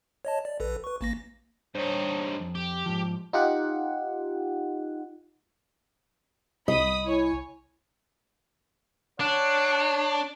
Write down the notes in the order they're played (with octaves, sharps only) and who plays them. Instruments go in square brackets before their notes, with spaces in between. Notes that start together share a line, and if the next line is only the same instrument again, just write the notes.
[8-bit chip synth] C#5 D#5 A5
D5
A#1 A4 B4
B4 C#6
A1 A#3 A#6
[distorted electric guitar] G2 D#4 [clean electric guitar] C5 C#5
[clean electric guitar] F2
[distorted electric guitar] G4
[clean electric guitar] G#2 F3
[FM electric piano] D#4 F4 G4 F#5
[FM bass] C2 [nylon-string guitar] D#5 [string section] B5 D#6 B6
[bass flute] E4 [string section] C#5 G#5
[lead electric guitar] D4 [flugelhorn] C#5 [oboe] F#5